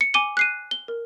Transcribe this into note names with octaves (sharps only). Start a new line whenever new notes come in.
C#7
G#5 D6 D#7 G7
F#6 C7 D#7
G7
A#4